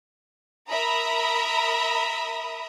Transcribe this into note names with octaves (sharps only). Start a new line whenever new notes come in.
A#4 E5 A#5 B5 D#6